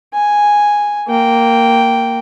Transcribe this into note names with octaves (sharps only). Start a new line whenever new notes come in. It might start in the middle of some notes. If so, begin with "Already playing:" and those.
G#5
A#3 G5